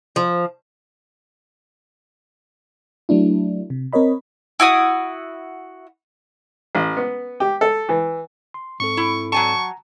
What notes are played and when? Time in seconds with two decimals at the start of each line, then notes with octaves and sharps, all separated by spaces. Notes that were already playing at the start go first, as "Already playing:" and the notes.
0.16 F3
3.09 F#3 A3 D4 E4
3.70 C3
3.93 C4 A#4 C#5 D#5 B5
4.60 E4 F#4 D#6
6.75 A1
6.97 B3
7.40 G4
7.61 A4
7.89 E3
8.54 C6
8.80 G#2 C4 A4 C#6
8.97 E4
9.32 F#3 G#5 A5 C#6
9.59 A#5